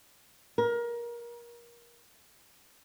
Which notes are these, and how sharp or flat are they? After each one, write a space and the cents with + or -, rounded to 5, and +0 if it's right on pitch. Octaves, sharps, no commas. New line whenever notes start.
A#4 +25